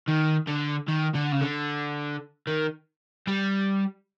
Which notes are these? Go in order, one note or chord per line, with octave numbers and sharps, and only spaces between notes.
D#3
D3
D#3
D3
C#3
D3
D#3
G3